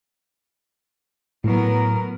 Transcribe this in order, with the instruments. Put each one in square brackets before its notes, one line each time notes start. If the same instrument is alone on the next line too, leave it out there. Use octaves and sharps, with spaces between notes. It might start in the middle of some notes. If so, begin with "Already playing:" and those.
[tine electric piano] A2 [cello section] F#3 B3 A#4